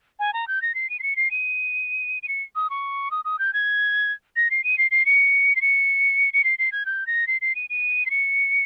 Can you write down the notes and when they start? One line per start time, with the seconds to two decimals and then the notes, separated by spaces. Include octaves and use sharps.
0.19 G#5
0.33 A#5
0.48 G6
0.62 A#6
0.75 C7
0.90 D#7
0.99 C7
1.03 C#7
1.16 C7
1.31 D#7
2.23 D#7
2.28 C#7
2.56 D#6
2.70 C#6
3.11 D#6
3.25 D#6
3.39 G6
3.53 G#6
4.36 A#6
4.51 C7
4.64 D#7
4.78 C7
4.91 C7
5.06 C#7
5.56 C7
5.62 C#7
6.34 C#7
6.44 C7
6.59 C7
6.72 G#6
6.86 G6
7.07 A#6
7.27 C7
7.41 C7
7.55 D#7
7.70 D#7
8.06 C7
8.11 C#7